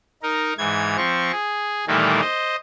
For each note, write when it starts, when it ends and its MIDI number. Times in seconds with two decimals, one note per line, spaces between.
0.22 0.53 63
0.22 0.53 70
0.58 0.97 44
0.58 0.97 52
0.58 0.97 92
0.97 1.31 53
0.97 1.31 60
0.97 1.31 85
1.32 1.85 68
1.87 2.21 46
1.87 2.21 51
1.87 2.21 52
1.87 2.21 55
1.87 2.21 57
1.87 2.21 58
2.21 2.56 72
2.21 2.56 75